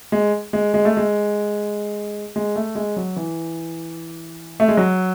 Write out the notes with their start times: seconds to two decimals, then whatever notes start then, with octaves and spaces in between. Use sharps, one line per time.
0.12 G#3
0.53 G#3
0.74 G#3
0.85 A3
0.97 G#3
2.36 G#3
2.56 A3
2.75 G#3
2.96 F#3
3.16 E3
4.60 A3
4.68 G#3
4.77 F#3